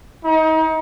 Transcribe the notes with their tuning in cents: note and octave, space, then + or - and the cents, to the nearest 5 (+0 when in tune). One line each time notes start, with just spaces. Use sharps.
D#4 +30